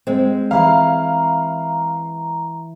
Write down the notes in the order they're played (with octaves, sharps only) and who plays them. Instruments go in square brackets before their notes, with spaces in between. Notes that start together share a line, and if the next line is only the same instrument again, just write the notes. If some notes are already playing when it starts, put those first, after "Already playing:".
[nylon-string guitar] G#3 C4
[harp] E3 [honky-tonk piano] F5 [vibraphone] A#5